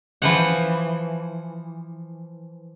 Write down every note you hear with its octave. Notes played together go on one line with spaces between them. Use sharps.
E3 F3 F#5